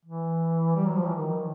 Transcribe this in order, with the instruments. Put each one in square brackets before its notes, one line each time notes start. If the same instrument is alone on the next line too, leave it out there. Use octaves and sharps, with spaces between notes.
[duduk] E3
G3
F#3
F3
E3
D#3